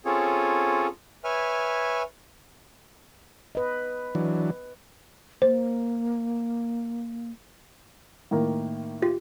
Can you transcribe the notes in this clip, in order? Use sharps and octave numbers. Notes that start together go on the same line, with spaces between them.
C4 C#4 F4 G#4 A4 C#5
B4 C#5 E5 G#5 F6
B4 D#5
E3 F#3 D4
A#3 C5
A2 D#3 A#3
F4 G4